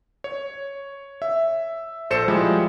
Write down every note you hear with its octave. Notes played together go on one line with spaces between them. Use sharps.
C#5
E5
A#1 A4 C5 C#7 E7
F3 G3 G#3 E4